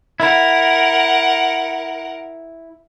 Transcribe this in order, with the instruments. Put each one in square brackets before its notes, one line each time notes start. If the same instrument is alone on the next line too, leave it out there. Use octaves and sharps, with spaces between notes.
[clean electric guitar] E4 [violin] A#4 F#5